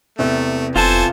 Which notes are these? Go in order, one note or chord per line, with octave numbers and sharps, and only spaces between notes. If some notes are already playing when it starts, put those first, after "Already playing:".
E2 C3 A3
F1 F4 A4 C5 G#5 A5